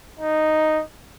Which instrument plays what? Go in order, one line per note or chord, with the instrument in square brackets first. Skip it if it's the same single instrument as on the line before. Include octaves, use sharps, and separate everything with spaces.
[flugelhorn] D#4